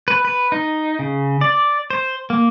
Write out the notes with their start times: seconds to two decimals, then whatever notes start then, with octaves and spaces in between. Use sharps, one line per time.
0.08 B4
0.25 B4
0.52 D#4
0.99 C#3
1.41 D5
1.90 C5
2.30 A#3